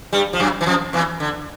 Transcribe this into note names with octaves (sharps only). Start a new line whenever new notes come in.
G2 G3
F3
F#2 F#3
E3
F2 F3
E2 E3
D3